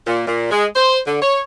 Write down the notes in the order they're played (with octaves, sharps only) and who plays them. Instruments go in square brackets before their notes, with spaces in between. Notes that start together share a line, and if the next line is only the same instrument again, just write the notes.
[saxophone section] A#2
A#2
G#3
C5
D3
C#5